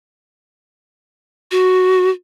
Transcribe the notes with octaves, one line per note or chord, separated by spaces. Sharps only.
F#4